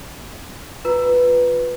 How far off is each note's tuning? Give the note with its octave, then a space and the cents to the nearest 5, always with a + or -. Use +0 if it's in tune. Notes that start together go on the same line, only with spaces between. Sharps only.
F4 +20 B4 +0 A#5 +0